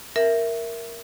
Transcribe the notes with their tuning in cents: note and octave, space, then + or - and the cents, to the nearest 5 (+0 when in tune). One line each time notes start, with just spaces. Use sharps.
A#4 +0 E5 +5